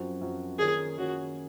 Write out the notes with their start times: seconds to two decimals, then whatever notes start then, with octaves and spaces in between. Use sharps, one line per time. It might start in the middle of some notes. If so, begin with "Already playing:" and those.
Already playing: F#2 F3 C4 F#4
0.21 F#2 F3 C4 F#4
0.59 D#3 A#3 C#4 F4 G#4
0.98 D#3 A#3 C#4 F4 F#4